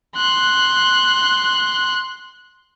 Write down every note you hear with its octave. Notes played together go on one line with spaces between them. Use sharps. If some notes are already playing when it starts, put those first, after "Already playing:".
C6 F#6